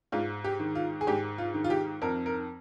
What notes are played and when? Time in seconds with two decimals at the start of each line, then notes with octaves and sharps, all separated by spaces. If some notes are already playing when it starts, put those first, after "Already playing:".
0.12 G#2 F4
0.44 G4
0.60 D#3
0.75 F4
1.01 G#4
1.07 G#2 G4
1.38 F4
1.54 D#3
1.64 F4
1.70 G4
2.02 F2 A#4
2.26 A#4